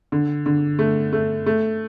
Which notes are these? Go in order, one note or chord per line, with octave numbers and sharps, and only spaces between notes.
D3
D3
A3
A3
A3